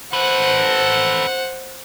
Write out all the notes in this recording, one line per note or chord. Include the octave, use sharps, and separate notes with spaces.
A4 B4 C5 F#5